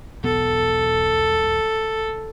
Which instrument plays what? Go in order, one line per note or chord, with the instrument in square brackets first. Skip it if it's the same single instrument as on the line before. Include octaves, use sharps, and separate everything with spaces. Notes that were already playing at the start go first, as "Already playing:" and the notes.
[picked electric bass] E1 B1 B3 [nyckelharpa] A4